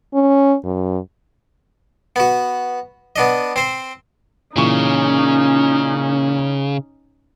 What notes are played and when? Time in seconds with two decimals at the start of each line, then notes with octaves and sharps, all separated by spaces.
0.14 C#4
0.64 F#2
2.16 B3 F#4
3.16 B3 D4 D#5
3.56 C4 C5
4.56 A#2 C#3 E3 C#4 D#4 C#6